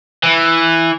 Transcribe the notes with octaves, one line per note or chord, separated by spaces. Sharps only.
E3